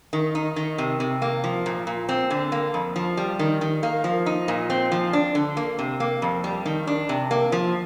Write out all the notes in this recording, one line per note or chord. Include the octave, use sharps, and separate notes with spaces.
D#3
D#4
D#3
C3
C3
A#3
F3
A#2
A#2
C4
D3
A#3
F2
F3
G3
D#3
D#3
A#3
F3
D#4
A#2
C4
F3
D4
D3
A#3
C3
A#3
F2
G3
D#3
D4
C3
A#3
F3